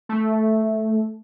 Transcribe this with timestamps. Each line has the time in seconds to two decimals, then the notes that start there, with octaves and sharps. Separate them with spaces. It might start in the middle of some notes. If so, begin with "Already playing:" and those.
0.09 A3